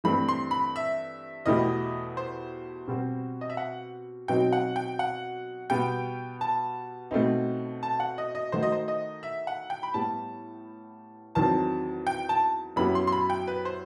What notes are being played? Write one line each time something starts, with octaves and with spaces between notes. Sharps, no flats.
G2 E3 A3 C4 B5
C6
B5
E5
E2 B2 A3 E4 G4 D#5
C5
B2 G3 C4 F#4
D#5
E5
F#5
B2 F#3 C4 D#4 F#4 G5
F#5
G5
F#5
B2 G3 B3 G5
A5
B2 A3 C4 D#4
A5
F#5
D#5
D#5
D#3 A3 D#4 F#4 C5
D#5
C5
D#5
E5
F#5
G5
B5
A2 G3 B3 A5
E2 D#3 F#3 C4 A5
G5
A5
F#2 F#3 B3 E4 G4 B5
C6
C6
B5
G5
B4
C5